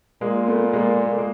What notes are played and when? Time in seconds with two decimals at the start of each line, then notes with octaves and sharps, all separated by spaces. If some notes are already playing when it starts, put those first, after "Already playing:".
0.21 A#2 G#3 A#3
0.47 A3 B3
0.73 G#3 A#3
0.98 A#3
1.08 A3
1.18 G#3 A#3